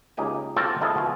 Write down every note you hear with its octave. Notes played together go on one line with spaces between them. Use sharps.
C#2 A#3 D#4 G4 G#5
C4 F4 F#4 A4 D5 A#5
F3 G#3 E4 A4 A#4 D#5
B2 F4 G#4